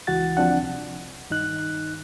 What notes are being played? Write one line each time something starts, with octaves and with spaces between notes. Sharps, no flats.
C#2 E3 F#4 F#5 A6
D2 F3 C4 D4 F#5
C2
G2 D#3 D#4 F#6